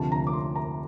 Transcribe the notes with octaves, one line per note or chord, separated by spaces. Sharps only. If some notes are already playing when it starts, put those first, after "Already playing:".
Already playing: D2 C3 F3 A5
A#5
D6
C6
A#5